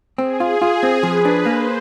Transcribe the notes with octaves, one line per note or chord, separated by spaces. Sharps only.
C4 G#4
F4
F4
C4
F3 B4
D4
A#3 C5